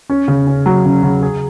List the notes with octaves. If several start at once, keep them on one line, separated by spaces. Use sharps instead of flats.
C#4
C#3
C#4
F#3
C#3
C#3
G#4